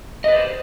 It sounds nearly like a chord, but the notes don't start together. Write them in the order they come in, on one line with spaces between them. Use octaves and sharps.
D#5 B4 D5 C5